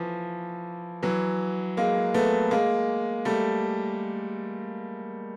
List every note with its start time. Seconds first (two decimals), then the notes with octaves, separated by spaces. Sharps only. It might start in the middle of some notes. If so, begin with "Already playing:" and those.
Already playing: E3 F3
1.03 E3 F#3
1.77 G#3 A#3
2.14 A3 B3
2.51 G#3 A#3
3.25 G3 A3